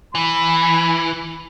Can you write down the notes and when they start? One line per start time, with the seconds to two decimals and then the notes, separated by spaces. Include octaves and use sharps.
0.15 E3 B5